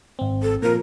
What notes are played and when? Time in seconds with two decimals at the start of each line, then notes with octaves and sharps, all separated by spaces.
0.19 G#1 C4
0.43 A4
0.62 A#2 F3 A#4